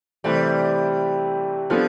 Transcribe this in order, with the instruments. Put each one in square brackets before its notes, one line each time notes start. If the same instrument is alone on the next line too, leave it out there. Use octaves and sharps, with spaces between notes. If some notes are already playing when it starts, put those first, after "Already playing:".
[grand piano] C3 E3 A3 C4 [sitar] G3
[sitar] F3 [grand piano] G3 B3 D4 F4 A4